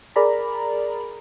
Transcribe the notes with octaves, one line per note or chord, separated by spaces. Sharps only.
G#4 A#4 D5 A#5 B5